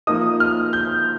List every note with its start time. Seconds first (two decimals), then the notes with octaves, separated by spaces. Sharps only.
0.07 F3 A#3 D#4 D#6
0.40 F6
0.73 G6